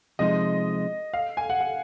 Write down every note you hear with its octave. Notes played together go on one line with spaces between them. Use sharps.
C3 F3 G#3 D#4 D#5
F5
G#5
F#5
F#5